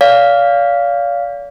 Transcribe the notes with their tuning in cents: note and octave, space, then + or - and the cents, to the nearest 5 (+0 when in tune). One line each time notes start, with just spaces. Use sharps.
D5 -45 F5 +0